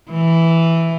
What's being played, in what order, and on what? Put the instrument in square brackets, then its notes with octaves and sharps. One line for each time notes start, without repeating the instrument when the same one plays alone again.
[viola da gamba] E3